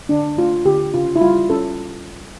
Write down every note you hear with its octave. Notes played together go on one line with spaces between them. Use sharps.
D3 D4
A3 F4
D3 G4
C#3 F4
E4
G3 F4
C#4 A4